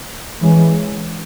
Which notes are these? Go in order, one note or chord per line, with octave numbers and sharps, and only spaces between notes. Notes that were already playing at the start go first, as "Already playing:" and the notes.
E3 G#3 C#4